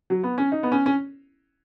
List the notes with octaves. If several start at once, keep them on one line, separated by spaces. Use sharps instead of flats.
F#3
B3
C#4
D#4
B3
C#4
C#4